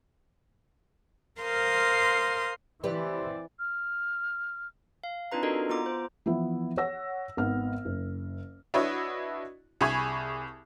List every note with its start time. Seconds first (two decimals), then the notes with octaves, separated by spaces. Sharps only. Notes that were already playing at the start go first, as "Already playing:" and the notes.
1.41 A#4 C5 F5 C6 D#6
2.84 E3 C4 G4 B4 C5 D5
3.59 F6
5.04 F5
5.32 C4 D4 D#4 F4 B4 A#5
5.43 D4 D#4 F#4 A4 A#4 D#5
5.69 B3 F4 A#5 D6
5.86 C5
6.26 E3 F3 B3 E4
6.77 C#5 F#5 E6 A#6
7.37 G#1 B3 F6
7.85 F#1
8.74 D4 E4 F#4 B4 C#5 D#5
9.81 C2 G#4 G#5 B5 C#6 G#6